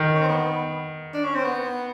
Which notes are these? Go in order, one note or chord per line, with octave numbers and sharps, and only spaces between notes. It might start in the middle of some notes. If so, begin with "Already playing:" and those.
Already playing: D#3
C#4
C4
B3
D4
C#4
C4
B3